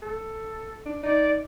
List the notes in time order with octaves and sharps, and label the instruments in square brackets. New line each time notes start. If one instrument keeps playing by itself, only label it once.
[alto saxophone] A4
D4
[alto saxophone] D#4 [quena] D5